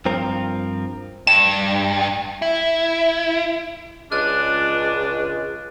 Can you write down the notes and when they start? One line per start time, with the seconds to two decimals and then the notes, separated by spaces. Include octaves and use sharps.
0.05 G2 F3 C4 A#4
1.27 G2 E7
2.42 E4
4.11 C#2 G#3 D4 F6 F#6 A6